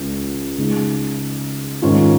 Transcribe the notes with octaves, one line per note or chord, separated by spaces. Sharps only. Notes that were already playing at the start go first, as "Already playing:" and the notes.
Already playing: C#2 C#3 G#3
C#3 G#3 D#4
G#2 D#3 C#4 F4